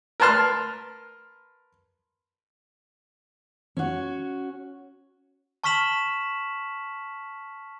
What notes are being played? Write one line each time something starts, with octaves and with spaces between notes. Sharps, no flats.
A#4 B4 A5 C6 F6
C#4 F#4
A5 C#6 F6 B6 E7 F#7